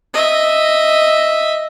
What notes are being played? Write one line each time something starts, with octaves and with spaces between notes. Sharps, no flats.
D#5 E5